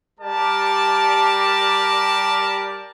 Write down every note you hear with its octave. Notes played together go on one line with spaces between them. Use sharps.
G3 G4 A#4 D5 A5